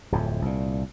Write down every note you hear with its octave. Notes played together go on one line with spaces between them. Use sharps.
D1 F2 A2
C2 A#2